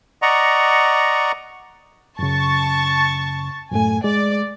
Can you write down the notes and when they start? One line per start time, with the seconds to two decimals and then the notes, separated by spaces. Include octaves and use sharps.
0.22 D5 D#5 F#5 A#5 C#6
2.19 F#2 C#3 A5 C#6 A6
3.71 F#2 A2 A3 G#5
4.04 G#3 D5